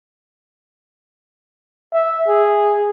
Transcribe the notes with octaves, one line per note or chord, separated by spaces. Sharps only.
E5
G#4